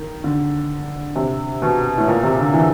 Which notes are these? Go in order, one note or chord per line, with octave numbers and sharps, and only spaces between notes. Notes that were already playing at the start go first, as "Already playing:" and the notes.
Already playing: D#3
D3
C3
B2
A2
A#2
C3
D3
E3